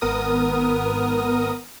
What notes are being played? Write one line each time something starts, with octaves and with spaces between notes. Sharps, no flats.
G#1 B3 A#4 D#6